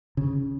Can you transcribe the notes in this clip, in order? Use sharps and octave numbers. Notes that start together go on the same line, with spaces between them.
C#3